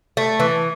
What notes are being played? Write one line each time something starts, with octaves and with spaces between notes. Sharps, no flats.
A3
E3